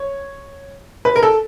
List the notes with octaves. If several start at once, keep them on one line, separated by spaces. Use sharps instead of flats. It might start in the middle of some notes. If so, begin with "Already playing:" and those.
Already playing: C#5
B4
A#4
A4